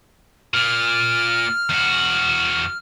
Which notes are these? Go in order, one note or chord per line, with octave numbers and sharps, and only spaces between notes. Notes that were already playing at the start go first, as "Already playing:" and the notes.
A#2 F6
E2 F#4